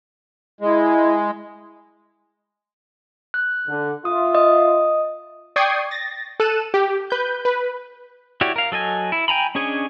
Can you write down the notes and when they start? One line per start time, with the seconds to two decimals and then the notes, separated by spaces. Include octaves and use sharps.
0.61 G#3 E4
3.34 F#6
3.68 D3
4.05 F4 E5 D#6
4.35 D#5 D#6
5.56 D5 G5 C#6 D#6 G#6 C7
5.91 A6 A#6
6.40 A4 F#6 D#7 E7
6.74 G4
7.10 B4 G6
7.45 B4
8.41 E4 F#4 G4 C#5 D5
8.56 A#4 F5
8.72 F#3 A4 D#5 G#5
9.12 E4
9.28 G5 G#5 A#5 B5
9.55 C#4 D4 G#4 C#5 D#5